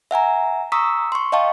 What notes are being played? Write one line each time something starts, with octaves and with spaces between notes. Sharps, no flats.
E5 F#5 G#5 A#5
A#5 C#6 D#6 E6 B6
C6 C#6
D#5 F5 G5 A5 C#6